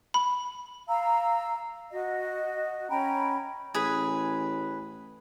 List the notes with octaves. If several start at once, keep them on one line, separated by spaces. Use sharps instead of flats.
B5
F5 A#5 E6
F#4 D#5
C#4 G5 A#5 B5
A1 G#4 B4